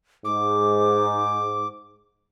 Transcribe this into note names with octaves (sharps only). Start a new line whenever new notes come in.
G#2 D6